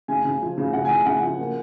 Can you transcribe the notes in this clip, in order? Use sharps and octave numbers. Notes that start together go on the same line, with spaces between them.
C#3 G#5
C#3
F3
C#3
C#3 F#5
G#5
C#3
G#5
C#3 F#5
F3
A#3